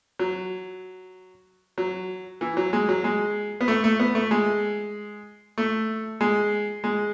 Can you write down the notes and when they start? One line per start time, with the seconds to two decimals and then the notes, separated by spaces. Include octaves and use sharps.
0.19 F#3
1.78 F#3
2.41 E3
2.57 F#3
2.73 G#3
2.89 F#3
3.04 G#3
3.61 B3
3.68 A3
3.84 A3
4.00 B3
4.15 A3
4.31 G#3
5.58 A3
6.21 G#3
6.84 G#3